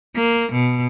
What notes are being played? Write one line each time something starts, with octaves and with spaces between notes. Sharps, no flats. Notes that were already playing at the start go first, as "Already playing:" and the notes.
A#3
B2